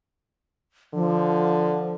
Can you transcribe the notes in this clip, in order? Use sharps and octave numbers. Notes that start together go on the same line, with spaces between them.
D3 F3